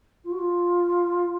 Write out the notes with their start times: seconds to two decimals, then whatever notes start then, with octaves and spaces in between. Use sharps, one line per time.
0.24 F4
0.31 F#4
0.38 F4